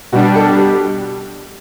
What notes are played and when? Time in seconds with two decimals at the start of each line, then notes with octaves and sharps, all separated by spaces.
0.12 B2 G3 D4 F#4
0.35 A4
0.58 G4